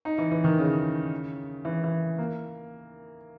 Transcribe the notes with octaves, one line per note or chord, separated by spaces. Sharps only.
D#4
E3
E3
D#3
C#3
E3
E3
A#3